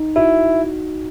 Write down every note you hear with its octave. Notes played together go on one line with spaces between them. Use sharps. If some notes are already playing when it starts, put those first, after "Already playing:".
Already playing: D#4
E4 F#4